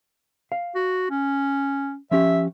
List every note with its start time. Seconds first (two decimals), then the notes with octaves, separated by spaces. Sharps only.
0.52 F5
0.75 F#4
1.11 C#4
2.11 F3 C#4 G4 E5